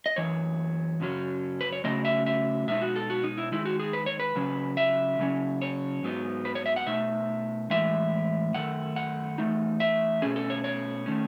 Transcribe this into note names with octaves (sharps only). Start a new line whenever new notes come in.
D#5
F#2 E3 C#5
F#2 C#3 F#3 C#4
B4
C#5
C#3 F#3 A3 C#4 D#5
E5
E5
B2 G#3 D#4 E5
F#4
A4
F#4
D#4
E4
D#3 G#3 D#4 E4
F#4
G#4
B4
C#5
B4
C#3 F#3 C#4
E5
C#3 F#3 C#4
C#5
G#2 F#3 B3 D#4
B4
C#5
E5
F#5
B2 A3 D#4 E5
A2 E3 G#3 E5
F#2 D#3 A3 F#5
F#5
E2 D#3 A3 D#4
E5
B2 A3 C#4 G#4
A4
C#5
C#5
D#3 A3 C#4